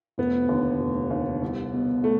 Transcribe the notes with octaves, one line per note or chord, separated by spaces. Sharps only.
F1 B3
D#2 D3
F1
D#2 D3
C2
B2
A3